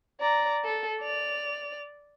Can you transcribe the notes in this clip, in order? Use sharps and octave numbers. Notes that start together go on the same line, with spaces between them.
D5 A#5
A4
D5 F7